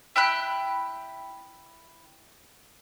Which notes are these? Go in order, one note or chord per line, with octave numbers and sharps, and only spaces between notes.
E4 G5 B5 F#6